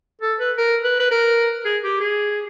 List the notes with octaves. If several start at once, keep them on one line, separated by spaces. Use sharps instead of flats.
A4
B4
A#4
B4
B4
A#4
G#4
G4
G#4